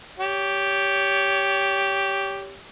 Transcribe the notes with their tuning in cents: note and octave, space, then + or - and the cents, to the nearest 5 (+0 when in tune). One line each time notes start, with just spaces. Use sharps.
G4 +0 C#5 +30